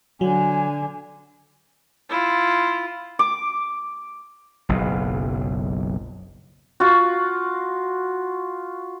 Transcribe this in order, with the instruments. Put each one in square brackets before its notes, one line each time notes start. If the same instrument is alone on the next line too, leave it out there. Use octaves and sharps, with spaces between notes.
[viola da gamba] D3 [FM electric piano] F#3 [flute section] G#5
[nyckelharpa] E4 F4
[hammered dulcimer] D6
[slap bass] F#1 B1
[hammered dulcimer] F4 F#4